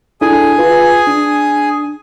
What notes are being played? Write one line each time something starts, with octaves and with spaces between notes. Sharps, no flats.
D4 E4 G#4 A4 G#5 D#6
F4 B4
D4